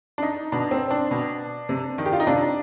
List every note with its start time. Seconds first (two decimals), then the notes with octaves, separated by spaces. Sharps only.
0.18 D4
0.22 D#4
0.52 B2 D4
0.71 C4
0.91 D4
1.11 B2
1.69 C3
1.98 D#3
2.06 G4
2.13 F4
2.20 D#4
2.27 C3 D4